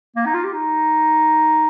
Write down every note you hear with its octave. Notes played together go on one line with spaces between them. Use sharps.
A#3
D#4
F4
G4
D#4